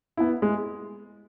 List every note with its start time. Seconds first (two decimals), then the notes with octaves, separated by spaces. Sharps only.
0.17 B3 E4
0.42 G#3